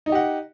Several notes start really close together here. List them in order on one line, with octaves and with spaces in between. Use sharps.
D#4 D#5 G4 F#5